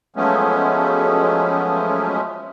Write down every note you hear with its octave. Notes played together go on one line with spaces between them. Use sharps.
F3 F#3 G#3 A3 B3 C#4